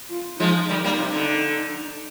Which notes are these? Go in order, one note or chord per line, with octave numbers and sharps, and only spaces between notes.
F4
F3 G#3 D#4
D#3 G3
G3 A#3
C3
D3